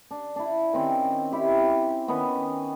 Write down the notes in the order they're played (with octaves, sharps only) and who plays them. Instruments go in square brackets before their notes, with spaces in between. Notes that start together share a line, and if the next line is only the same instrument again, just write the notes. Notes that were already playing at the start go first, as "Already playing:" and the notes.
[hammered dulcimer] D4
D4 E4
D#3 C4 C#4
E4 G4
D#3 B3 C#4